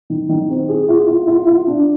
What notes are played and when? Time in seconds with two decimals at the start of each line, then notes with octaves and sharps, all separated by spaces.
0.10 D#3
0.29 D#3
0.50 C4
0.68 G#4
0.89 F4
1.08 F4
1.27 F4
1.47 F4
1.67 D4